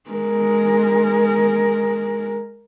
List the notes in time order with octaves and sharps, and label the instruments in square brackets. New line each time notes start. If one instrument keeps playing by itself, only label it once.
[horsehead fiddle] G#3 A#4